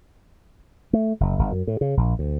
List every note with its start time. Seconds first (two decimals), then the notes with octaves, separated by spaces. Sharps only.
0.93 A3
1.20 F#1
1.39 G1
1.52 F#2
1.67 A2
1.81 C#3
1.97 A#1
2.19 D2